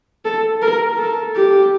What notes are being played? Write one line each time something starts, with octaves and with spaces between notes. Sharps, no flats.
A4
A#4
A4
G4